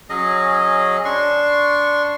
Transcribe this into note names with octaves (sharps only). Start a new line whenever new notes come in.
F#3 C#4 G#4 D#5
D4 C6 C#6